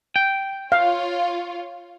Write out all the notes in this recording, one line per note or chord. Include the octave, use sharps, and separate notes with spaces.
G5
F4 C#5 F5